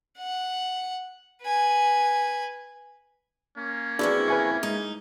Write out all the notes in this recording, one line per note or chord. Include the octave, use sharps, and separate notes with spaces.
F#5
B4 G#5
A#3 C#4
F2 E3 D4 E4 F#4 G#4 C#6
B4 E5 G#5 C#6 G#6
G#3 D#4